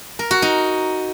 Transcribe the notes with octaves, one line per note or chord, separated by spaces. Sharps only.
A#4
F#4
D#4